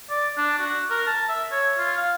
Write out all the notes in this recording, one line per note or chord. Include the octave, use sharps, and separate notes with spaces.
D5
D4
F#4
A#4
A5
E5
C#5
F4
F5